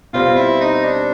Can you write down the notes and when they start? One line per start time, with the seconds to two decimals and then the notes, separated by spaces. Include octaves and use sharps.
0.13 B2 G3 C4 F4
0.37 E4
0.61 D#4
0.84 D4